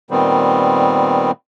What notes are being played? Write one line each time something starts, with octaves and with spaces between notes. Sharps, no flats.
A#2 D#3 G3 B3 C4